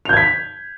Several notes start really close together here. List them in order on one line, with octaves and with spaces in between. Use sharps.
F7 G6 G#6 B6